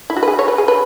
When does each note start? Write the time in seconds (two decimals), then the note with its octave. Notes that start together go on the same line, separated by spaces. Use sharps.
0.10 E4
0.17 F#4
0.23 B4
0.28 G#4
0.39 C#5
0.48 B4
0.58 G#4
0.68 B4